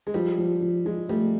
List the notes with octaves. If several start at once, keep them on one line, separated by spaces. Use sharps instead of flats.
G#3
F3 G3
F3
F3
F3 G#3
G3 A3